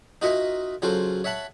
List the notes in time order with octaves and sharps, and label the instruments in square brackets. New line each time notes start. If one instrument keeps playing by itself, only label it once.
[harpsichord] D#4 F4 F#4 A#4 D#5 E5
C#3 F#3 F4 F#4 A4 C5
C#5 E5 F#5 A5 B5